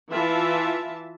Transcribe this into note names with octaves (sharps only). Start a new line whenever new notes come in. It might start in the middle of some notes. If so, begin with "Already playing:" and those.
E3 F4 E5 A5